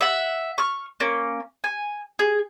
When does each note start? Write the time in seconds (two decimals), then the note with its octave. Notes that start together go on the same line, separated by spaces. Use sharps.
0.01 E5 F#5
0.58 C#6 F6
1.00 A#3 C#4
1.64 G#5
2.19 G#4